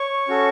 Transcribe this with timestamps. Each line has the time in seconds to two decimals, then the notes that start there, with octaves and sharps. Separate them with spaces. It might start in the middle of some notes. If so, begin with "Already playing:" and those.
Already playing: C#5 C#6
0.28 C#4 F#4 A4